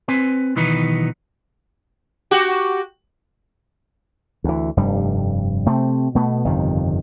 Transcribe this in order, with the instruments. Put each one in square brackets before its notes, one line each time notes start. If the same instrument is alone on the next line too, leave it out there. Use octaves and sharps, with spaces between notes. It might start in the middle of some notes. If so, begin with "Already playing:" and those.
[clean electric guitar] C4 B4 G#5
B1 D#3 E3 B3 D#4 B4
[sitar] F#4 G4
[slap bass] D2 E3
F1 G2 G3
C3 A3 C4
B2 A3 B3
G1 F2 C3 D#3